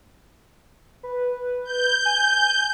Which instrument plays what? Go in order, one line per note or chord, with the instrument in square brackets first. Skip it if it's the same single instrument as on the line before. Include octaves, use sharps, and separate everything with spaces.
[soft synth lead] B4
[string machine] G6
[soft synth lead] G#5